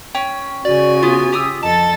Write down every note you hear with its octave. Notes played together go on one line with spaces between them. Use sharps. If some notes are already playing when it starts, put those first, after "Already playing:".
C#4 G5
C#3 F#4 D5 G#5
B3 F4
G4 D#6 E6
F2 A4 D#5 A5 A6